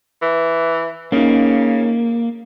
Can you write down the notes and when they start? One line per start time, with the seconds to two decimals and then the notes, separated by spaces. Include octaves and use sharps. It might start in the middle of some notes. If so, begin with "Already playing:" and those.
0.22 E3
1.12 C#3 A#3 C#4 D#4